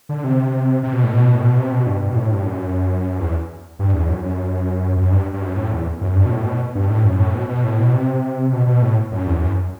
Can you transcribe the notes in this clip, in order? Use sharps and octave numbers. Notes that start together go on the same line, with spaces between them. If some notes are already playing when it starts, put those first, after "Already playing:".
D3
C3
C3
B2
A2
B2
A2
B2
C3
B2
G2
G2
B2
A2
G2
F#2
E2
G2
E2
F#2
F#2
F#2
G2
G2
F#2
A2
E2
F#2
G2
B2
A2
B2
G2
A2
F#2
A2
B2
B2
A2
B2
C3
B2
B2
A2
F#2
E2
F#2